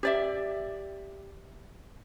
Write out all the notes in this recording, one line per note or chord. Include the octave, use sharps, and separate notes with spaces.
G4 D5 E5